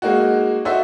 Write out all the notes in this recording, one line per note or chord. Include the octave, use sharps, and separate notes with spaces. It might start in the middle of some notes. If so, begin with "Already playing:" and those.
G#3 A#3 D#4 F#4
D#4 F#4 A4 C5 E5